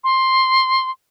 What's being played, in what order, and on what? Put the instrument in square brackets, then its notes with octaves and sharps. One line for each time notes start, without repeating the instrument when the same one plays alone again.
[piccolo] C6